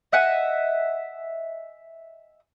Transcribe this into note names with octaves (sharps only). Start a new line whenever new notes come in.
D#5 E5 F#5 G#5